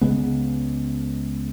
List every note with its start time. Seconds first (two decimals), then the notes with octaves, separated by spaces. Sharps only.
0.01 C#2 C#3 G#3 B3